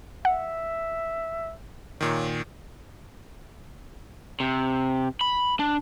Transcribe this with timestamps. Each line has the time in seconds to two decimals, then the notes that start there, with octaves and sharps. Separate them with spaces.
0.25 E5 F#5
2.01 A#2 D#3 C#5
4.40 C3
5.21 B5
5.59 D4